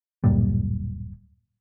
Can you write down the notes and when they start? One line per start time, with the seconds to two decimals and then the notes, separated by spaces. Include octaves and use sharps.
0.24 D1 F#2 A#2 G3